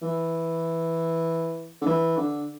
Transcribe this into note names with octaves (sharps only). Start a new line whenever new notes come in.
E3
D3
E3
D3